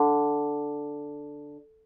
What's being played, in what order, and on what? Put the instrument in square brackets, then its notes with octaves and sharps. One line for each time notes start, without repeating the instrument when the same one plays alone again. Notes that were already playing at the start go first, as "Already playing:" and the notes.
Already playing: [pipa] D3